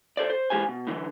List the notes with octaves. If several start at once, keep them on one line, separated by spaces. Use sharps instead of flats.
A4 C5 D5
C5
E3 G#3 G4 C5 G#5
B2
A2 D3 E3 F#3